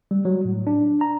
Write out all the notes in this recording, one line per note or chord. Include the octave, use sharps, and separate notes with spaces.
G3
F#3
A2
D4
A#5